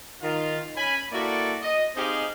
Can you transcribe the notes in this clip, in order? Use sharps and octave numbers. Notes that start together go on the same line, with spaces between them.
D#3 F4
C#4 G#5 B5
A#3 E4 F#4 A4 D5
D#5
C4 D#4 G4 G#4 C5 F5